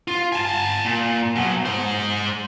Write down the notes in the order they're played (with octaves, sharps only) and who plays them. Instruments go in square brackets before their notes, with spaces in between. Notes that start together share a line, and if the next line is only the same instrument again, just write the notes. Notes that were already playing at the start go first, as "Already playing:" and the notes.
[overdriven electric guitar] F4
G#5 A5
A#2
B2 F#3
G#3 C5